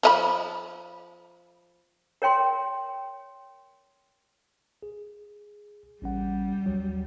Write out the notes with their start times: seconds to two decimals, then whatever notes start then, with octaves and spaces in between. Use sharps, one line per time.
0.03 F3 D#5 B5
2.22 A#4 C#5 G5 C6
4.83 G#4
6.02 A1 G3 C#4 F#5
6.66 D#2 F#3